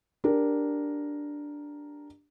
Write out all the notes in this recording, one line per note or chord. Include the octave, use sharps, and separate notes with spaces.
D4 G4 A#4